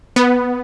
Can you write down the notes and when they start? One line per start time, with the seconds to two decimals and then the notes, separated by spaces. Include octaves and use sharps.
0.16 B3